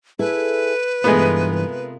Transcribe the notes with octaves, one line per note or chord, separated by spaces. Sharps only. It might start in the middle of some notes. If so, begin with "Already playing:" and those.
E4 G#4 A4 B4
G2 C3 E3 G#3 A3 B3 F4 A#4